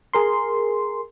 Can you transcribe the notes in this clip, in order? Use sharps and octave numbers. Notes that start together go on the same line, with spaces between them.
G#4 A#4 C6